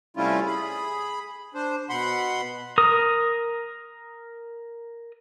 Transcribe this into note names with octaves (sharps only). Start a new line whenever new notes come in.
C3 G3 A3 C#4 E4 F4
G#4 B5
D4 C5
B2 F#5 B5 C6
A#4 D#6